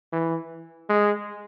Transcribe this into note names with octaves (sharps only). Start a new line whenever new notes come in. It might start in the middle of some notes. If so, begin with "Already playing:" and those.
E3
G#3